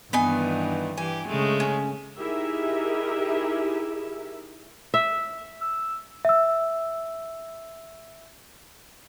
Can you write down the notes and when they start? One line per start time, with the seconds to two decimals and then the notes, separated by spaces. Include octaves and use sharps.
0.13 G2 D#3 E3 B3 D#4 G#5
0.97 E3 G4 G#5
1.28 C#3 G#3 A3
1.60 C#4
2.18 D#4 E4 G4 G#4 A#4 E5
4.94 E5
5.61 E6
6.25 E5 E6